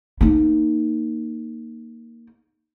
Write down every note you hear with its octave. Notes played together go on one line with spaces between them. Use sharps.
A#3 D#4